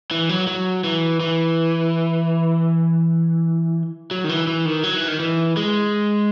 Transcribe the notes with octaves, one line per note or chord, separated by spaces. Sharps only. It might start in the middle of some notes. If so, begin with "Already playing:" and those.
E3
F#3
F#3
E3
E3
F#3
D#3
E3
E3
D#3
F#3
E3
D#3
E3
G#3